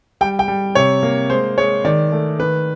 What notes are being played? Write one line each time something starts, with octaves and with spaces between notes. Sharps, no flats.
G3 G5
G5
G3
C3 C#5
A#3
G#3 C5
G#3 C#5
D#3 D5
A3
D#3 B4